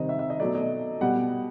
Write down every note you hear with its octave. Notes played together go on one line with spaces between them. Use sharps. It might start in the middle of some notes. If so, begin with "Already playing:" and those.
Already playing: C3 D#3 G3 C5 D#5
E5
E5
D#5
B2 F#3 A3 D5
D#5
B2 G3 F#5